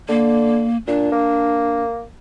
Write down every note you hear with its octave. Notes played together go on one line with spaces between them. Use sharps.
D3 A#3
A#2 D4
A#3